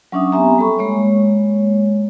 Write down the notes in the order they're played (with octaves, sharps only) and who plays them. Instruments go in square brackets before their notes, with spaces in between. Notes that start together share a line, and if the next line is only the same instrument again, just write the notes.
[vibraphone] F#3 C#4 D4 E5 D#6
B3 C4 G4 E5 G#5 A#5
G3 A4 B5 C#6
G#3 A#3 C#5